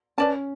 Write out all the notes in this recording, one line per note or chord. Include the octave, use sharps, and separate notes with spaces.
C#4 B4 D5 A5